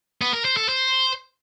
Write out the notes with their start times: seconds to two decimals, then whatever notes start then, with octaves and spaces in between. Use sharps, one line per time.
0.21 B3
0.33 A#4
0.45 C5
0.57 A4
0.69 C5